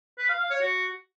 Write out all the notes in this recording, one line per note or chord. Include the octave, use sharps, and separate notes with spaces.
B4
F5
F5
C#5
F#4